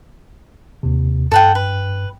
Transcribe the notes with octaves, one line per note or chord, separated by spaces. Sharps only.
D#2 C3
G2 A4 F#5 G5
B4